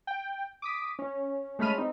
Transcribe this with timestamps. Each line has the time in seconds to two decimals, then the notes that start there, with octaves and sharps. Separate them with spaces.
0.07 G5
0.62 D6 D#6 B6
0.99 C#4
1.59 G#3 A3 C#4 B5 F6 D#7
1.78 C4 D#4